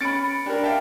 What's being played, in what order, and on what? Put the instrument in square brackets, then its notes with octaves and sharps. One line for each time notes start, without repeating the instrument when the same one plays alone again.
[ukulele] C#4 B4 B5 [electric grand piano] A6 C#7 D7
[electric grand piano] D4 A#4 [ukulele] G4 D5
[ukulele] E5 [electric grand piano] F5 G5 A5